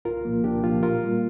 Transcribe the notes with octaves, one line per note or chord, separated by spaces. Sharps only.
C2 F4 A#4
A#2 F3 A#3
C2 D4 G4
A#2 F3 A#3 F4
A#2 F4 A#4
G3 A#3